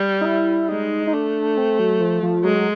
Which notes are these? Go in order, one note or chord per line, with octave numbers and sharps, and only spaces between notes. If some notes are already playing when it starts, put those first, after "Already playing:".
Already playing: G3
D#4
E4
G#3 D#4
D#4
A3 D4
C4
F#3
F3
F3
F#3 G#3